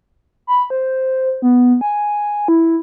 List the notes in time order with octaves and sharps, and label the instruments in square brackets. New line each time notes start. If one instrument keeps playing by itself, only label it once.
[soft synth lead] B5
C5
B3
G#5
E4